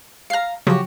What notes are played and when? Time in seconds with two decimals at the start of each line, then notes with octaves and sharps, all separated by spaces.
0.30 F5 A#5 F6 C7
0.67 C#3 F3 F#3 F#4 G4